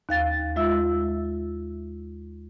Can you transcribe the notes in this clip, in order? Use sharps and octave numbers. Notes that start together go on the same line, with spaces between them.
D#2 F5 A6
G#3 F4 E5 E6